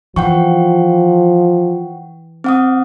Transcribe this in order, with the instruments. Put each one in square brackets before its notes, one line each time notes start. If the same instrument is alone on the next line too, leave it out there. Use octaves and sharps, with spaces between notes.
[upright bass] E3 [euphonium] F3 [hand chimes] F#5 G5 C#6
[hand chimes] C4 F#5 D#6